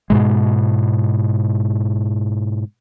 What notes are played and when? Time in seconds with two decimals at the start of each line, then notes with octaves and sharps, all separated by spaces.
0.10 G#2 B2 G#3